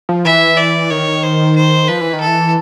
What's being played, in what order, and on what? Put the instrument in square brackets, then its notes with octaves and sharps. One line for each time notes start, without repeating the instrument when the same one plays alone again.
[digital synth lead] F3
[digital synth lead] E3 [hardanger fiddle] E5
[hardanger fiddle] D5
[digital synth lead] D#3 [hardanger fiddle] C#5
[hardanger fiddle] C5
C5
[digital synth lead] F3 [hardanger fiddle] B4
[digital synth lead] E3
D#3
[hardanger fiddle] A4
[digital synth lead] E3